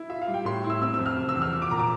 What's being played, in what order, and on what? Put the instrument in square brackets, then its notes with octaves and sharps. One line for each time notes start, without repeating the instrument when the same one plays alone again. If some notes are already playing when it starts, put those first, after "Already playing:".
Already playing: [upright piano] E4
F4 E5
F5
G3
G5
A2 C6
E4
E6
C4 E6
E6
F2
F6
C3
E6
E2
F6
F3 E6
D6
A#2 A#5
D6